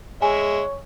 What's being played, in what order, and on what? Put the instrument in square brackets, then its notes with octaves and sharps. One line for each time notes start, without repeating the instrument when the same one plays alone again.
[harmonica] G#3 E5 [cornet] C#5 [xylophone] G#5